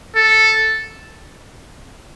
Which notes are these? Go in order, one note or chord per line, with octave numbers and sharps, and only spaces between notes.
A4